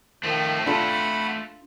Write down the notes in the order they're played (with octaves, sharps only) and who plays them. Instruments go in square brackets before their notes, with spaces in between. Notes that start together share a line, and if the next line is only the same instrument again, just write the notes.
[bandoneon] D#3 F3 [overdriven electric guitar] A3 C4
[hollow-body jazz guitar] D4 F4 A4 [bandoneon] F#5 B5